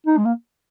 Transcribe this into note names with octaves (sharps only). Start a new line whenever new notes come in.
D#4
G#3
A#3